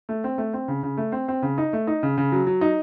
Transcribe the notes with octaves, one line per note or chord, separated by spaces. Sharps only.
A3
C4
A3
C4
C#3
C#3
A3
C4
C4
C#3
D#4
A3
D#4
C#3
C#3
F#3
F#3
D#4